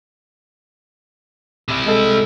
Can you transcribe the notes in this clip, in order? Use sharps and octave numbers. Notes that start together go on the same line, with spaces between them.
C3 E4
G#3 A4